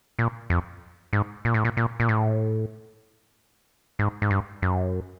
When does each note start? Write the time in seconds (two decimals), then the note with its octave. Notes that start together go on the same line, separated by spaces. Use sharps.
0.19 A#2
0.50 F2
1.13 G#2
1.45 A#2
1.54 A2
1.65 A#2
1.77 A#2
2.00 A#2
2.09 A2
3.99 G#2
4.22 G#2
4.31 G2
4.62 F#2